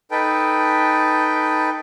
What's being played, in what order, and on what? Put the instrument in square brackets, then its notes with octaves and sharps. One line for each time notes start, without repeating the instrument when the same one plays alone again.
[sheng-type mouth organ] D#4 A4 B4 G5